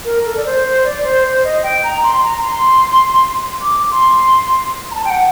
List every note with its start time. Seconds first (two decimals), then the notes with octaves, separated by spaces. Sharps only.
0.05 A#4
0.25 A4
0.37 D5
0.45 C5
0.64 C5
0.84 D5
1.04 C5
1.24 C5
1.44 D#5
1.63 G5
1.83 A#5
2.04 C6
2.23 A#5
2.43 C6
3.61 D6
3.91 C6
4.91 A#5
4.95 A5
5.05 G5
5.10 F#5